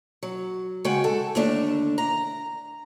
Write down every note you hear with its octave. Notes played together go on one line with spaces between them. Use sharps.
F#3
C#3 G#3 F#4 G5
A4
D#2 D3 A3 D4
A#5